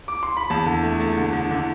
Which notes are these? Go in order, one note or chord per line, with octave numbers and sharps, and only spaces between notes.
D6
C6
B5
E2 A5
D3
A3
A3
D3
D3
D3